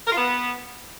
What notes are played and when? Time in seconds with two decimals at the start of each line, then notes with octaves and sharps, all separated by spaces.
0.07 A#4
0.12 F4
0.17 B3